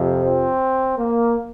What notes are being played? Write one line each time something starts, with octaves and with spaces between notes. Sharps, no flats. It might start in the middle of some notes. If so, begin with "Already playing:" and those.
Already playing: F2 C3 F3
C4
A#3